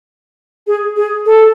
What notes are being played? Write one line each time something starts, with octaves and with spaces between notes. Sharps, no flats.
G#4
G#4
A4